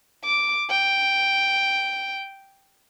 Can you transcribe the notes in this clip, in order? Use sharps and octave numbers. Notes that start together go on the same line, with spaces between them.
D6
G5